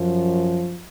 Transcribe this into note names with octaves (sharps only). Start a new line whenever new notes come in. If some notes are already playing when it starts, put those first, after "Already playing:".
Already playing: F#2 F3